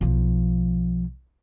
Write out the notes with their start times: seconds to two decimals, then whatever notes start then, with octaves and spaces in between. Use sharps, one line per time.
0.01 B1 F3